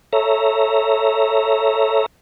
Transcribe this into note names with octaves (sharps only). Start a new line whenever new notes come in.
A4 C#5 E5 A#5